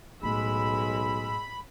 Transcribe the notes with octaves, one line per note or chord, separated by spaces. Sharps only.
B1 A2 G#3 B5 E6